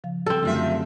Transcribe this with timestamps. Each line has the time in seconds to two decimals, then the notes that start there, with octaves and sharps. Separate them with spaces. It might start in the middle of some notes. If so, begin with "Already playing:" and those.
0.04 C#3 F3 F5
0.26 C4 A4
0.43 F#2 D3 D#3 G3 A3 F4 F#4 E5